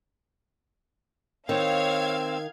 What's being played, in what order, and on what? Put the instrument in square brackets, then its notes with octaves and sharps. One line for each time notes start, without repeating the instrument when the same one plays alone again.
[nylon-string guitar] D#3 [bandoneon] C4 E6 [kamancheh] C#5 [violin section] F5 G#6